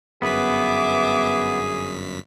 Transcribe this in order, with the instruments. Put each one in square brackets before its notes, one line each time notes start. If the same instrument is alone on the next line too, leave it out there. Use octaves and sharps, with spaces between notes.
[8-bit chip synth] G1 F#2 B6 [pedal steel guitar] B3 B4 [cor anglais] G#4 [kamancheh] E5 D6